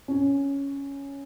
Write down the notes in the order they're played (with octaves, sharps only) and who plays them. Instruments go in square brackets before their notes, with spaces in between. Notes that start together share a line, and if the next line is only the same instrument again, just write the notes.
[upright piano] C#4